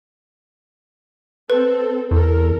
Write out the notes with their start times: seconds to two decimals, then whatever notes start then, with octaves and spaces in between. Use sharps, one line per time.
1.50 C4 A4 B4
2.11 E2 A4 A#4